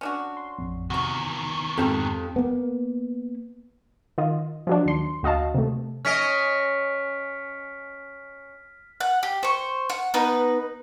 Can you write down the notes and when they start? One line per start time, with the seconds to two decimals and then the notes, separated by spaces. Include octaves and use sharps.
0.01 C#4 D4 F#4
0.37 C6
0.58 A1 F2
0.90 E2 C3 D#3 F#4 C#6
1.78 F2 G#2 G4 A4 A#4 F#6
2.36 A#3 B3
4.18 D#3 F4 D#5
4.67 F3 F#3 D4
4.86 D#2 C6
5.23 D2 F#4 D#5 F5 A5
5.55 C3 A3
6.05 C#4 D#5 F6 B6 D7
9.00 F#5
9.23 G4
9.43 C5 C#6
9.90 F#5
10.14 B3 D#4 B4